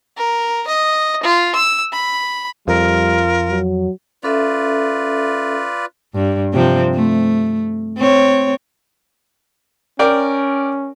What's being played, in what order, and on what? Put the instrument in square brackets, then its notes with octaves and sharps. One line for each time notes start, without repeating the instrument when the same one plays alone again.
[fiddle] A#4
D#5
F4
E6
B5
[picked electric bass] F2 [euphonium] G3 [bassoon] F4 [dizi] A#4
[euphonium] F#3
[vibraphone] C#4 A4 E5 [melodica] F4 B4 D5
[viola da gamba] G2
C3 F3 C4
A3
C4 C#5
[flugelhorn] C#4 [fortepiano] A#4 D5 G5